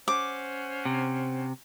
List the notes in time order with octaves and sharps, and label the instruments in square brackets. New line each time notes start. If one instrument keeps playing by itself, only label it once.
[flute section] C#4 C5 F#5 [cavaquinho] D6
[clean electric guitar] C3